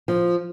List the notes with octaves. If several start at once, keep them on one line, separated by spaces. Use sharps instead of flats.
F3